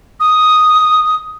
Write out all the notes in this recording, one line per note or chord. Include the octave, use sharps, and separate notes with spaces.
D#6